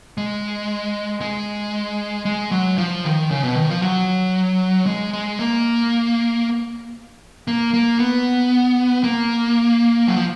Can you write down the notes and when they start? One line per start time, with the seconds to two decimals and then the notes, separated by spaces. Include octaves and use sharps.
0.18 G#3
1.21 G#3
2.26 G#3
2.52 F#3
2.78 F3
3.05 D#3
3.31 C#3
3.43 B2
3.56 D#3
3.70 F3
3.82 F#3
4.86 G#3
5.13 G#3
5.39 A#3
7.48 A#3
7.74 A#3
7.99 B3
9.04 A#3
10.08 F#3
10.16 F3